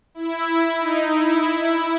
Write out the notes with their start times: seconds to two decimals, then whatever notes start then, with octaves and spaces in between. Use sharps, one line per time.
0.15 E4
0.78 D#4
1.10 E4